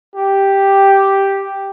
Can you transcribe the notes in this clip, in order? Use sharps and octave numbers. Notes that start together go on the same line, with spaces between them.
G4